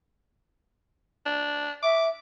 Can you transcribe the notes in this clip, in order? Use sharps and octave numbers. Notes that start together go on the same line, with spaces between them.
D4
E5 D6